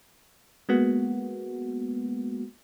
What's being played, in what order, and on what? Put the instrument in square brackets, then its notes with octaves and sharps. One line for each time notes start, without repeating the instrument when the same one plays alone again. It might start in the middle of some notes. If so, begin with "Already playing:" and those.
[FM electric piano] G#3 A#3 B3 F#4